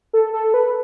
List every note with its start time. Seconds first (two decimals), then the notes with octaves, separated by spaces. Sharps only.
0.13 A4
0.33 A4
0.54 B4